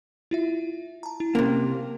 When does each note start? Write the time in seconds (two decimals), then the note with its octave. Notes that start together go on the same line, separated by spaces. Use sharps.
0.31 E4 F4 E5
1.03 A5 A#5
1.20 E4
1.35 C3 A#3 C#4